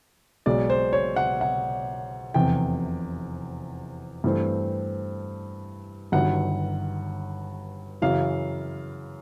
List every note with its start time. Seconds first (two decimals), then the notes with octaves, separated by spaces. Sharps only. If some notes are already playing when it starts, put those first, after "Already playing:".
0.46 B1 B2 G#3 D5
0.70 C5
0.93 C#5
1.16 F#5
1.41 F#5
2.34 F1 E2 C3 G5
4.24 G2 E3 A3 C4
6.12 G1 G2 D#3 F#3 F#5
8.02 F#2 C#3 E3 F5